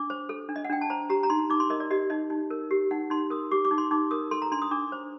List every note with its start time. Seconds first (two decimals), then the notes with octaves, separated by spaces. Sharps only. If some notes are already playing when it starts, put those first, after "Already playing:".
Already playing: D4 D6
0.10 C5
0.29 A4
0.49 D4
0.56 D#5
0.64 F#5
0.70 D4 G5
0.81 A5
0.90 C5 A#5
1.10 G4 A#5
1.23 A#5
1.30 D#4 C6
1.50 D#4 D6
1.60 C6
1.70 A#4 D#5
1.80 D5
1.90 G4 D#5
2.10 D#4 D#5
2.30 D#4
2.51 A#4
2.71 G4
2.91 D#4 F#5
3.10 D#4 C6
3.30 A#4 D#6
3.51 G4 D6
3.65 D6
3.71 D#4
3.78 C6
3.91 D#4 D6
4.11 A#4 D#6
4.31 A4 C6
4.42 A#5
4.52 D4 C6
4.62 D#6
4.71 D4 D6
4.92 C5